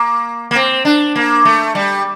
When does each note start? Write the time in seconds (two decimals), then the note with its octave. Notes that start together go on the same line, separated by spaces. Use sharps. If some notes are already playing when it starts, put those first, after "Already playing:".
Already playing: A#3
0.51 A#3
0.55 C4
0.85 D4
1.16 A#3
1.45 A3
1.75 G3